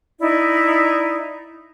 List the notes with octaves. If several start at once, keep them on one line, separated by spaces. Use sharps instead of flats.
D#4 E4 D5